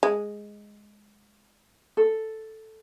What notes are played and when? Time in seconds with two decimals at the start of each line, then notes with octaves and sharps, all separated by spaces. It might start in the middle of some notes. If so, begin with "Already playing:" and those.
0.03 G#3
1.97 A4